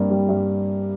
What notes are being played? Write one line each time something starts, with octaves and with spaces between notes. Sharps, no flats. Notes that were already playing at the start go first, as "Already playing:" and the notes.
Already playing: G2 A#3 C4
G3
G2